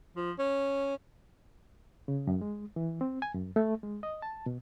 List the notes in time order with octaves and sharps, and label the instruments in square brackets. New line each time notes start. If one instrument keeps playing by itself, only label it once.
[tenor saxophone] F3
C#4
[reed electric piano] C#3
F#2
G#3
E3
C4
G#5
F#2
A3
G#3
D#5
A5
B2